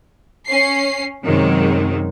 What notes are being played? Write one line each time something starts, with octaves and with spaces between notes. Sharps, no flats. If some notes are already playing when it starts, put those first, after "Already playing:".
C#4 C7
F#2 C3 D#3 F#3 G#3